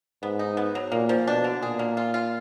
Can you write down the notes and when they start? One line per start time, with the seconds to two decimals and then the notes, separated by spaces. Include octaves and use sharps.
0.22 G#2 B3
0.39 D#4
0.57 B3
0.75 F#3
0.92 A#2 A#3
1.09 F3
1.27 B2 D4
1.44 D3
1.62 A#2 G#4
1.79 A#3
1.97 F4
2.14 F4